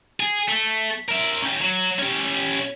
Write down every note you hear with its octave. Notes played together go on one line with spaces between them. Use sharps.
G#4
A3
A#4 E5
C#4 G4
F#3
C#4 G4